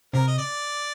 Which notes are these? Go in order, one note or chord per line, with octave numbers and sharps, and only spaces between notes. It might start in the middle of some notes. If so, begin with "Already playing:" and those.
C3 A#4
D#5
D5